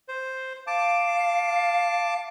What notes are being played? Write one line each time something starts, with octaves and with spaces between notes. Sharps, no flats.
C5
F5 A5 D6